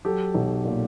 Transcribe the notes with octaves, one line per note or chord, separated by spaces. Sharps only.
F#3 G4 A4
B1
A#2